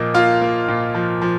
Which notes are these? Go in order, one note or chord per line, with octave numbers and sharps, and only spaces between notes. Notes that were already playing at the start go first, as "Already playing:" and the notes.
Already playing: A#2 F3 A#3 D#5
A#3 F4 F5
A#3
A#2
F3
F3